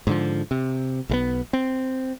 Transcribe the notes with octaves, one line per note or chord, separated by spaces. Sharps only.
G#2 D3 F3
C3
B1 G3 B3
C4